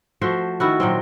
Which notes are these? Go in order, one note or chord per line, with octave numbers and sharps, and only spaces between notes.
F3 A3 F#4 C5
D#3 E4 F#4
A#2 F#3 C4